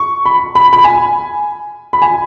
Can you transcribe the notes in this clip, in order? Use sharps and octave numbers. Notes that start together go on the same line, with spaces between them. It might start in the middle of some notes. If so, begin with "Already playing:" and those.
Already playing: C#6
B5
B5
B5
G#5
B5
G#5